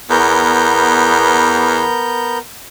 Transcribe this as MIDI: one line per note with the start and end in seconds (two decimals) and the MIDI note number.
0.10 1.84 40
0.10 2.38 59
0.10 2.38 70
0.10 2.38 91